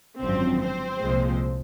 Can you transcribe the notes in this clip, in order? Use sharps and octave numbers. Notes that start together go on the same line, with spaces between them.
G#1 F#2 D3 F3 C4 C5
C4 C5
C2 A#2 F3 G#3